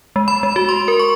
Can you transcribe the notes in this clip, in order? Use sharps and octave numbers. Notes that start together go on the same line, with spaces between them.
G#3
B5
G#3
F#4
C6
A#4
C#6